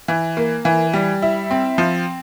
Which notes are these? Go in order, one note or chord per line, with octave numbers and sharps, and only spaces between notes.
E3
A#3
E3
G3
E4
C4
F3